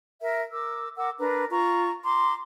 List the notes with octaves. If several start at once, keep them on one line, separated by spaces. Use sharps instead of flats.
A#4 E5
A#4 D6 E6
A#4 F#5 D6 E6
D4 A#4 B4 A#5
F4 A#5 C#6
A#5 C6 D6